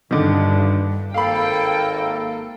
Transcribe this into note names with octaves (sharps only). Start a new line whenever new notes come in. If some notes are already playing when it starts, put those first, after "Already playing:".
A#1 G2 D3 D#3 D4
G#1 A#3 A4 F5 G5 B5